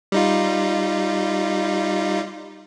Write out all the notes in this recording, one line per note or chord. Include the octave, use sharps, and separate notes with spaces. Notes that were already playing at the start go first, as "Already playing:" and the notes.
G3 D#4 F4